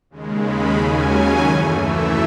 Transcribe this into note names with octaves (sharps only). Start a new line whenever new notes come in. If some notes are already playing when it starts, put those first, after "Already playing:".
D#2 C#3 G#3
B5
D#2 C#3 F#3 C#4 G#5
F#2 E3 A3
E5